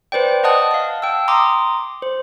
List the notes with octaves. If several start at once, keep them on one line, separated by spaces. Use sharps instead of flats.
B4 C5 D5 G5
D#5 F#5 A5 D#6 F#6
F5 A5
G5 E6
A#5 C6 D6 D#6
C5